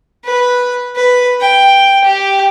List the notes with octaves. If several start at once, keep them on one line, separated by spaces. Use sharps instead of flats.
B4
B4
G5
G4